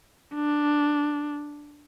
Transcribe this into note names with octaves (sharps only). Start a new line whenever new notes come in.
D4